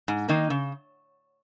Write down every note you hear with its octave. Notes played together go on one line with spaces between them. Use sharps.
G#2
D#3 A#3 D#4
C#3